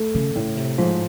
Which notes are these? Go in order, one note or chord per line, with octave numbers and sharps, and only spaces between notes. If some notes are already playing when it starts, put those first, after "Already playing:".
Already playing: A3
C#3
A2 C#3
C3
G#2 F3